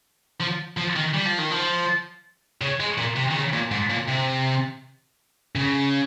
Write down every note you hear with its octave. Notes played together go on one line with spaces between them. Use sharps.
F3
F3
D#3
G3
F3
D#3
F3
C#3
G#3
A#2
C3
D#3
C#3
A#2
G#2
A#2
C3
C#3